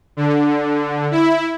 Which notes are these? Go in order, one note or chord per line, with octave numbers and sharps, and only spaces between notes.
D3
E4